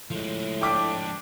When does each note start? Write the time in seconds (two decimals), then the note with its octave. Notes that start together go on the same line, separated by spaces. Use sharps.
0.11 A2 F3 G#3
0.62 D4 G5 D6 B6